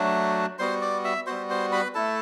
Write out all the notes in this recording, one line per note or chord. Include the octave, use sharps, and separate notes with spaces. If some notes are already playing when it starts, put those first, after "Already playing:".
Already playing: F#3 A3 D4 F#4
G3 B3 F#4 C5 C6
D5 D6
E5 E6
G3 B3 F#4 C5 C6
C5 C6
B4 B5
A3 E4 A4 A5